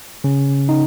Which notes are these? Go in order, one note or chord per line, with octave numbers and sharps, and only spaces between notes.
C#3 C#4
D#4